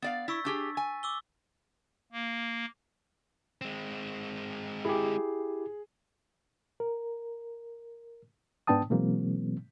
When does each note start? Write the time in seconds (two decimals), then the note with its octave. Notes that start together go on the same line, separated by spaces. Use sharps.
0.02 B3 D5 F5 A6
0.28 E4 C#6 E6 B6
0.45 D4 G4 G#4
0.77 G#5
1.03 D6 E6 G7
2.12 A#3
3.61 G#3 C4
4.85 E4 G4 G#4
6.80 A#4
8.67 G#2 B3 D4 G5 A5 D#6
8.90 B2 E3 F#3 G#3 A#3 C4